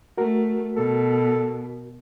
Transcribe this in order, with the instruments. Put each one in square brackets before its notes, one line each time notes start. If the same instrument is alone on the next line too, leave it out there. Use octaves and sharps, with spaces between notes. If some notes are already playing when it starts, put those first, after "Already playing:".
[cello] A3 [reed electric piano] F#4 A#4
[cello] B2 [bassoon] A4